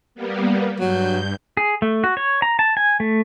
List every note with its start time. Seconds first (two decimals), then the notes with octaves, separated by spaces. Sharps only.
0.15 G3 A#3 B3
0.80 G2 F#3 G6
1.57 G#4
1.82 A3
2.04 F#4
2.17 C#5
2.42 A#5
2.59 A5
2.77 G#5
3.00 A3